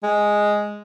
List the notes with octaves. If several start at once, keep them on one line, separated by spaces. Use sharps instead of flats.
G#3